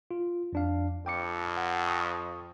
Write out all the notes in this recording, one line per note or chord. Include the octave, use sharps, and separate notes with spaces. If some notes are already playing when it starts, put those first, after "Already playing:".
F4
F2 D4 F5
F2 G5 D6 C#7
F#5
C#6 D#6